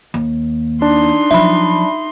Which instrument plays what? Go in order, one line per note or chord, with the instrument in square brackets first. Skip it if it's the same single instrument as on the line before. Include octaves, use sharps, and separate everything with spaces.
[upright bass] D#2
[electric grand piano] D4 [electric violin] D#4 C6
[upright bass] F3 F#3 [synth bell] E5 B5